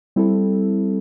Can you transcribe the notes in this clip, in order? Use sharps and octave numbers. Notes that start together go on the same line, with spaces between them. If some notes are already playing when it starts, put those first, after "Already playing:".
G3 C4 E4 A4